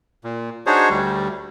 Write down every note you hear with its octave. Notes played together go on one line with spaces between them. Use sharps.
A#2
D4 D#4 F#4 G#4 C5 C#5
D2 G3